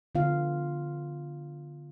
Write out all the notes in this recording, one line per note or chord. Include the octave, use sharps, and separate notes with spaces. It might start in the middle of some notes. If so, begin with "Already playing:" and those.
D3 B3 F4 F5